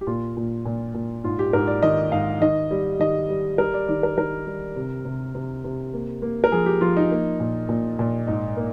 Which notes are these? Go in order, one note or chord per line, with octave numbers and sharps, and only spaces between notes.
G4
A#2 F4
A#2
A#2
A#2
G#2 F4
G4
G#2 A#4
D5
D#3 D#5
G#2 F5
D#3 D#5
G3
D#3 D#5
G3
G3 A#4
D5
D#3 D5
A#4
D#3 A#4
G3
C3
C3
C3
C3
A#3
A#3
A#4
F3 G#4
G4
F3 F4
D#4
A#3
A#2
A#2
A#2
G#2 D#4
A#3